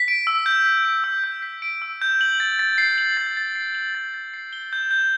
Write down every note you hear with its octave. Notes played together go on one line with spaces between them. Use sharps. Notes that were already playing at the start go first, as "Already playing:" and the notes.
Already playing: B6
D7
E6
G6
B6
D7
E6
G6
B6
D7
E6
G6
F#7
A6
A6
C7
F#7
A6
A6
C7
F#7
A6
A6
C7
G7
G6
G6